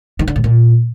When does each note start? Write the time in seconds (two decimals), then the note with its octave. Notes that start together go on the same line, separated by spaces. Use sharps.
0.19 D#3
0.28 D3
0.36 A2
0.44 A#2